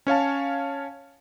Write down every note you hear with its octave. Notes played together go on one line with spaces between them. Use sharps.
C#4 C#5 F5 A5